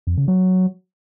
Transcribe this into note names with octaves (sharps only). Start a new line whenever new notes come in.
F2
C#3
F#3